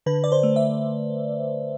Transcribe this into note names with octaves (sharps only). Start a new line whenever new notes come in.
D3 B4
D5
C5
A3
E5